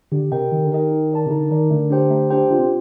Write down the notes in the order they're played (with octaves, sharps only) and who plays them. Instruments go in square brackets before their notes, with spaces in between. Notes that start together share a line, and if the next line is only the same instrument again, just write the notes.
[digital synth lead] D3 [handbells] G4
[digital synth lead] C3 [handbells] A#4 D#5 G5
[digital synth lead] D#3 [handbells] G4
[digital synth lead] D3
[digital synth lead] D#3 [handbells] A#4 D#5 G5
[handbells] D#4
A#4 D5 A5
[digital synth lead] C3
[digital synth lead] D3 [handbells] D#4
[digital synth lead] D#3 [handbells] A#4 D5 A5
[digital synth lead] D3 [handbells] A3
[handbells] D4 G4 C5 G5
A3
D4 G4 C5 G5
[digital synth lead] D3 [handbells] F4
[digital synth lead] C3